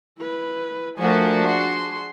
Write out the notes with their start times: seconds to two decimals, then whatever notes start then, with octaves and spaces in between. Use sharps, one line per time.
0.19 E4 B4
0.99 F3 A3 D4 F#4 A#4 G#5
1.47 G#4 C6